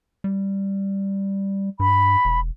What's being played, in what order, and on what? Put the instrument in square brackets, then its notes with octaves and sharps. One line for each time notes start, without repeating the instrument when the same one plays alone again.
[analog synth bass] G3
[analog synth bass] G2 [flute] B5
[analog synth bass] E1